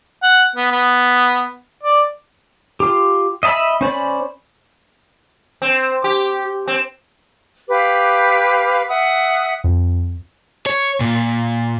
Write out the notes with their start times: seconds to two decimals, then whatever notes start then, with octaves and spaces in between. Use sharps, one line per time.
0.23 F#5
0.56 B3
0.72 B3
1.83 D5
2.80 F4 G4
3.43 D#5 E5 A5 B5 E6
3.81 C#4 C5 D5 B5
5.62 C4
6.04 G4
6.68 C4
7.68 G4 B4 F5 D6
8.88 E5 F#5 D#6
9.64 F2
10.66 C#5
11.01 A#2